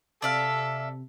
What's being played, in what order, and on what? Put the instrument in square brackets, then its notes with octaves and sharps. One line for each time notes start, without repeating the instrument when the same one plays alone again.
[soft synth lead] C3 [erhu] A4 [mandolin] D5 E5 F5